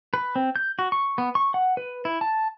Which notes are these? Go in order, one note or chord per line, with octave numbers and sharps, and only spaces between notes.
B4
C4
G6
F#4
C#6
B3
C#6
F#5
B4
E4
A5